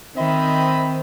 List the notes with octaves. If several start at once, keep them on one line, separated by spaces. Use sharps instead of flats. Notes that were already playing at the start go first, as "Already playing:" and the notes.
D#3 C4 D#5 E5 B5